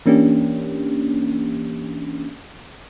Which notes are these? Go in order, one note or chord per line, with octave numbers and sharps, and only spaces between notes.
E3 A#3 C#4 D4 G4